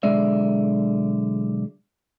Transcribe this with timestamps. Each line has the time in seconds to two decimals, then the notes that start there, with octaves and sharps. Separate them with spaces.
0.03 B1 D3 G#3 D5 E5